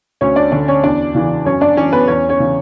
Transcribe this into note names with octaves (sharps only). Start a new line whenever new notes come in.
D2 C#4 C#5
D4 D5
D3 D4 D5
C#4 C#5
E2 D4 D5
C#3 E3
F#2 C#4 C#5
D4 D5
E3 C#4 C#5
B3 B4
E2 C#4 C#5
C#4 C#5
C#3 E3